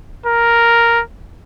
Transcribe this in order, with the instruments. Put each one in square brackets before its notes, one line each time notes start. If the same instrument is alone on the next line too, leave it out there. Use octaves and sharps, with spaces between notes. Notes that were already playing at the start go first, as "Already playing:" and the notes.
[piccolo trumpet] A#4